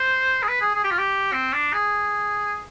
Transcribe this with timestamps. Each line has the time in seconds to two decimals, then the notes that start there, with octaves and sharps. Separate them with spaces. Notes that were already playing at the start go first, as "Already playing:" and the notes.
Already playing: C5
0.43 G#4
0.48 B4
0.61 G#4
0.75 G#4
0.84 G4
0.91 F4
0.99 G4
1.32 C4
1.53 D4
1.73 G#4